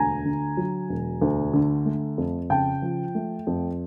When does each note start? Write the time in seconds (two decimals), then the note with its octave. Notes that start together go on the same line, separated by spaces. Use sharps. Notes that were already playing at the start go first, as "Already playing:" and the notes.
Already playing: E1 D2 G#5 A#5
0.25 D3
0.57 F#3
0.89 E1
1.22 D2
1.53 D3
1.86 A3
2.18 F2
2.50 C#3 G5 A5
2.82 F3
3.15 A3
3.47 F2